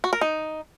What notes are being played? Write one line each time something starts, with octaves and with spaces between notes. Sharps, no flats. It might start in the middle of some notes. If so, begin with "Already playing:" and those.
F#4
A#4
D#4